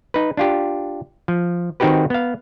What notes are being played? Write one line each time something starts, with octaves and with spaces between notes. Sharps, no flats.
D#4 B4
D4 F4 G4
F3
D#3 C4 D#4 F#4 G4 B4
B3 F5